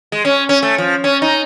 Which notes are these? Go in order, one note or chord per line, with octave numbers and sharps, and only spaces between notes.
G#3
C#4
C#4
A3
F3
C#4
D#4